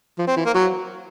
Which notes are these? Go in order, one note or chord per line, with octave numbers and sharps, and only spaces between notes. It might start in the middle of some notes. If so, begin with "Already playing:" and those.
F3
C4
E3
A#3
F#3